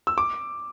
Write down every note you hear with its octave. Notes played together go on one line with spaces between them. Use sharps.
E6
D6